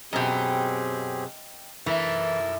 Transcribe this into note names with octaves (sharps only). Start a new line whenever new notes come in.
F#2 B2 C4 G4 G#4 D#5 G5
F#2 E3 A4 A#4 E5 E6